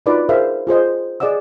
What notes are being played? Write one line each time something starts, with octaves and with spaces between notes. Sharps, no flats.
D4 D#4 F4 F#4 B4 D5
G#4 A#4 C5 E5 F5
F4 G#4 C5 D#5
G#4 D5 D#5 F#5 E6